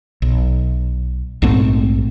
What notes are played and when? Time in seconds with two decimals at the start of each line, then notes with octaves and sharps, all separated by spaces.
0.22 B1
1.42 A#1 G#2 A3 C4